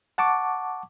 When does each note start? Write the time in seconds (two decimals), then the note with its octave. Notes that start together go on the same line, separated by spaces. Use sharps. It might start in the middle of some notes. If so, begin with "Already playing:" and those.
0.18 F#5 A5 C#6 D6